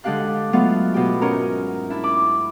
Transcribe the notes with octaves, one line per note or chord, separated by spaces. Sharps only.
D3 G#3 D4 G4 F5 F#6
F#3 G#3 A3 B3 F4
B2 G4
G#2 C#4 D#4 A#4 A#5
D4 E4
B5 D6